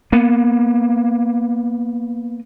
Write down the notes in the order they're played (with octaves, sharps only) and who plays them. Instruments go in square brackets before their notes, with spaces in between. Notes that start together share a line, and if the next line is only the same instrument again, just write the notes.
[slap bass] A#3 B3